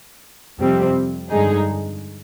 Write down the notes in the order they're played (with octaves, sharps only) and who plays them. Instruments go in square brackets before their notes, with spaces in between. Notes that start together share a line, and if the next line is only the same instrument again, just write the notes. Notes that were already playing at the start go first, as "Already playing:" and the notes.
[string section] F2 C3 G3 C4
G2 D3 G#3 D#4 G#4